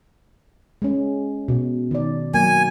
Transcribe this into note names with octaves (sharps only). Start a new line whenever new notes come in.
G#3 C#4
B2
D#3 D5
F#3 A#3 G#5